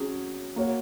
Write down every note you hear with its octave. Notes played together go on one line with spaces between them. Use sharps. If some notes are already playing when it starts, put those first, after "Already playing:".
Already playing: F#3 C#4 G#4
A#3 F#4 C#5